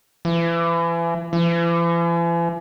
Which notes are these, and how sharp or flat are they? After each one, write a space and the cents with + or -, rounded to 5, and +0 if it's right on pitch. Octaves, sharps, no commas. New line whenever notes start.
E3 +35
E3 +45